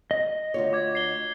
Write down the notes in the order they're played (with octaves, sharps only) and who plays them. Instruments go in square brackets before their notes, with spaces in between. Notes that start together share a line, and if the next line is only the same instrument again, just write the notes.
[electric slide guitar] D#5
[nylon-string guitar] D2 F4 C#5
[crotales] D6 G#6
C7 G7